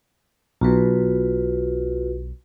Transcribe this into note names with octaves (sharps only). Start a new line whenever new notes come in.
B1 B2 F4 F#4 B4